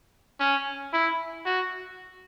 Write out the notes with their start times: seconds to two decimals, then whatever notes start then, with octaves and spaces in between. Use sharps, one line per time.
0.40 C#4
0.93 E4
1.45 F#4